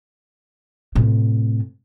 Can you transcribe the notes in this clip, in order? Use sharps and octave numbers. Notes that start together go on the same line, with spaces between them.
A2 C3